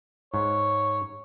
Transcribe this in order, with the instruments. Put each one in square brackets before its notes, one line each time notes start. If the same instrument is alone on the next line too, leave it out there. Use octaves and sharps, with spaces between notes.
[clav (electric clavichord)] G#2 [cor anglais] C#5